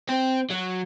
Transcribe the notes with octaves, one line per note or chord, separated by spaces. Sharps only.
C4
F#3